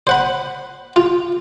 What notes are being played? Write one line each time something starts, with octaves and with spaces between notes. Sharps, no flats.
C5 F#5 B5
F4